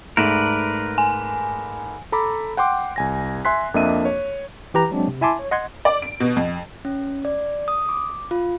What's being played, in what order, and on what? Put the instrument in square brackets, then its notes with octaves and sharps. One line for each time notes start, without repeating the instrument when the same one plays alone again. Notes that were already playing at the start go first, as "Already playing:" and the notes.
[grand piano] G#2 A3 E7 [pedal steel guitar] A#4 B4 D5
[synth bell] G#5
[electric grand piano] A4 A#5 B5 D6
F#5 G5 C6 D6
C2 G#5 A#6
E5 G#5 C6 F#6 B6
F2 A#3 D4 D#5 E5 D#7
C#5
[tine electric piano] E3 G4 B4 A#5
F#3 G#3 C4 D4
C3
E4 E5 G#5 A5 C6 D6
C#5
D#5 F#5 C6 G#6
[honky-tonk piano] D5
D7
B2
F2
[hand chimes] C#4
D5
D#6
D6
F4